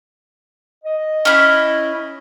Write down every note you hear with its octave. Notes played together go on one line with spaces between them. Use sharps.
D#5
C#4 E4